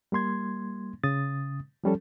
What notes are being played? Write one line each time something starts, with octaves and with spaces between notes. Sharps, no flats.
G3 A#3 C6 G#6
C#3 D#6 A6
F3 G3 C#4 A4